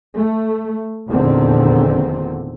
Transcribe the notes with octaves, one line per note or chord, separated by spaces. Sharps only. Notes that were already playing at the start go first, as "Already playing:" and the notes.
A3
F1 E2 A#2 D3 D#3 C4